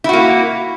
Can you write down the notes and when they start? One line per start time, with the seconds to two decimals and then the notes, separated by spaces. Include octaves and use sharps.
0.04 E4
0.09 F#4
0.13 A#3